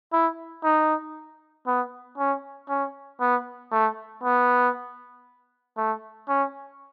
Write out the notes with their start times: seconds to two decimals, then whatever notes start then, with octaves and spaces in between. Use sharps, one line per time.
0.13 E4
0.64 D#4
1.67 B3
2.18 C#4
2.69 C#4
3.21 B3
3.72 A3
4.23 B3
5.77 A3
6.29 C#4